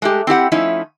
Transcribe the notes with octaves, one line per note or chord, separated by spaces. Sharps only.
G#3 A3 G4
C4 E4 G4 F#5
F3 A3 C#4 D#4 E4